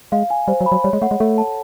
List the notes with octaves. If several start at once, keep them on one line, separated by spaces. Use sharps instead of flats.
G#3 F5
G#5
G3 C5
F#3
B5
F#3
G3 C#5
G#3
A3 F#5
G#3
A3 A4
A5